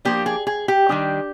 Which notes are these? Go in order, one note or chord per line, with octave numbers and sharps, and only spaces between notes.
F3 A#3 D4 G4
G#4
G#4
G4
D#3 G3 D4